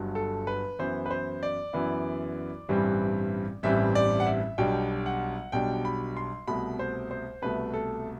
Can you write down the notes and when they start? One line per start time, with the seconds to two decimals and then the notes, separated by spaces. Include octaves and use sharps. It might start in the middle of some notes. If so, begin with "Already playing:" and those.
Already playing: G1 G2 F#3
0.15 A4
0.47 B4
0.79 F#2 E3 B3 E4 C5
1.06 B4
1.10 C5
1.43 D5
1.73 F#2 E3 B3 E4
2.69 A1 G2 E3 G3 C4
3.63 A1 G2 E3 G3 C4 E5
3.95 D5
4.20 F#5
4.26 E5
4.58 B1 B2 G3 D4 G5
5.06 F#5
5.52 B1 B2 G3 D4 G5
5.85 B5
6.17 C6
6.48 C2 B2 A3 B5
6.79 C5
7.11 C5
7.42 C2 B2 A3 B4
7.74 A4